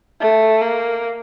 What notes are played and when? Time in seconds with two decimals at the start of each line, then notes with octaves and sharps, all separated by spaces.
0.20 A3
0.61 A#3